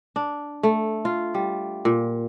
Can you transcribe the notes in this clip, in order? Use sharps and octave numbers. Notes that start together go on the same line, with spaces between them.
D4
A3
F4
G3
A#2